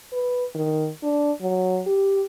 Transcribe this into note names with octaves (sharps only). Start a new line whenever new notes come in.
B4
D#3
D4
F#3
G4